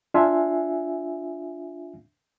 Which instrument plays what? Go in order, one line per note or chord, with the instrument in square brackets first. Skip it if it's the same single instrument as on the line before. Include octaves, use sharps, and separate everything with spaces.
[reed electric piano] D4 F4 E5 F5 G#5